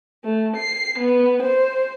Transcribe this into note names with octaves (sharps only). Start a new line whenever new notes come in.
A3
C7
B3
C5